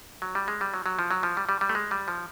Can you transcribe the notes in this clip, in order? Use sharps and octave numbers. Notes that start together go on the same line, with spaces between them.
F#3
G3
G#3
G3
F#3
F#3
F3
F#3
F3
G3
G3
G3
A3
G#3
G3
F3